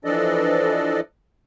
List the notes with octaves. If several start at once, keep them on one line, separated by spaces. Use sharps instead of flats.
E3 F3 D4 A4 D5 D#5